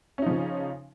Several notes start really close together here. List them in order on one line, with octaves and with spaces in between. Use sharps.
C#4 D#4 F3 C#3